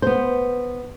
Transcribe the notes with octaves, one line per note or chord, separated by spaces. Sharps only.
B3 C5